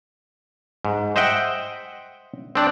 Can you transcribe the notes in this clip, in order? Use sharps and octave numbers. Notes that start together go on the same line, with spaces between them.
G#2
C5 D#5 E5 F#5 G5
C4 D4 D5